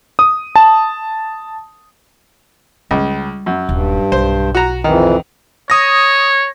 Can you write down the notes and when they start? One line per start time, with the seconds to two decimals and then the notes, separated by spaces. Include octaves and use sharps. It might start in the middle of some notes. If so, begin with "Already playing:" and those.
0.19 D#6
0.56 A5
2.91 C#2 G3
3.46 F#2
3.69 D#1 G2
4.12 B1 C5
4.55 F#4 A#5
4.84 F2 D#3 E3
5.70 C#5 D#6 A#6